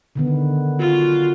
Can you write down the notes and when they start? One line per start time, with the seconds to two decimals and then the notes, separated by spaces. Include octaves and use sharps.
0.15 D3 D#3 B3
0.79 F4 F#4